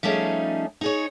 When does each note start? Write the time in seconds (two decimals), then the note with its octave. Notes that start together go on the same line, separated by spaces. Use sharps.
0.03 F3 G3 A3 C#4 D#4 G#4
0.81 D#4 G#4 C#5